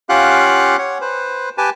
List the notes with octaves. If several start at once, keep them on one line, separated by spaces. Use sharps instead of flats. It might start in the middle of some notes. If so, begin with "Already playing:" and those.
C#4 F4 G4 F5 F#5 F#6
C#5 F#5
B4 C5
G4 B4 G#5 A5